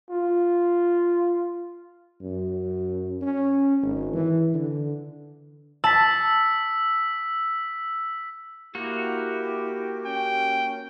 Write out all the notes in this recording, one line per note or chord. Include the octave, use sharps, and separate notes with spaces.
F4
F#2
C#4
G#1
E3
D3
A5 E6 B6
A#3 E4 F#4 G4
C#4 G5